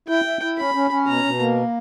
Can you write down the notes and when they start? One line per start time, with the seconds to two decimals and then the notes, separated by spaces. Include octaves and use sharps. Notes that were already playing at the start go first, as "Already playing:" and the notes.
0.08 E4 G5
0.25 E4
0.42 E4
0.57 C#4 B5
0.74 C#4
0.91 C#4
1.07 B2 A#5
1.24 B2
1.40 A#3